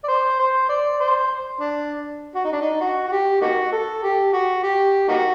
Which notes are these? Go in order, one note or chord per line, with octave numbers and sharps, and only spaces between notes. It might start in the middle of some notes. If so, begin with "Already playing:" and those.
D5
C5
C5
D5
C5
D4
F#4
D#4
D4
D#4
F#4
F#4
G4
A#3 D#4 F#4
A4
G4
F#4
G4
A#3 D#4 F#4